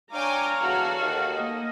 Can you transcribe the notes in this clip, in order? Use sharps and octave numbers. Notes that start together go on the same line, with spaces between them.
D4 C#5 F5 G5 G#5 A#5 D6
E2 F#4 A4
D#2
A#3 D#5